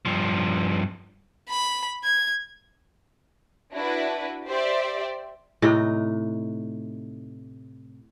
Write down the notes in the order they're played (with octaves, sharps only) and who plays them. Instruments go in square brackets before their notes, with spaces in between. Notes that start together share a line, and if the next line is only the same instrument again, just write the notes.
[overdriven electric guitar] G2 F3
[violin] B5
G#6
[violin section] D4 E4 F#4 B4
G4 C5 D5 E5
[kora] A2 C3 D#4